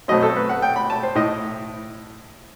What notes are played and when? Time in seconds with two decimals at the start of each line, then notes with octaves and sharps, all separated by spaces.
0.08 B2 F#3 A3 C4 D#5
0.23 A4
0.36 B4
0.49 F#5
0.62 G5
0.76 B5
0.90 A5
1.03 C5
1.15 A2 D#5